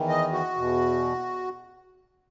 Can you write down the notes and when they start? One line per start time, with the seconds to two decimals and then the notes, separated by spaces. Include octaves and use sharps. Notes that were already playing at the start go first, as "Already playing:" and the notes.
Already playing: E2 D#3
0.09 D#5
0.32 F#4
0.56 E2 B2